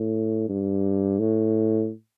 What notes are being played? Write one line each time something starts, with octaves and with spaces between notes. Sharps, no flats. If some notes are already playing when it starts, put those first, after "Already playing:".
Already playing: A2
G2
A2